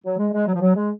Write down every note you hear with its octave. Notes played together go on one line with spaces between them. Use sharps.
F#3
G#3
G#3
F#3
F3
F#3
G#3